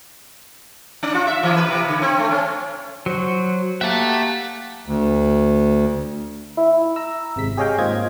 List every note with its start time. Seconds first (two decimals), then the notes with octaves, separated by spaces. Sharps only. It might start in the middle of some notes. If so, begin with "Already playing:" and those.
1.03 C#4
1.15 F4
1.27 E5
1.43 E3
1.57 B4
1.68 C3
1.88 D3
2.02 C4
2.19 A3
2.31 C#4
3.06 F#3 F#4 C5
3.81 A#3 G4 E5 F#5 A5
4.87 D2
6.57 E4
6.96 A#5 E6
7.36 G#1 C3 G#3 B6
7.57 G4 G#4 C#5 D#5 F5 G5
7.78 G#2 A#3 C4 F4 D#5 G#6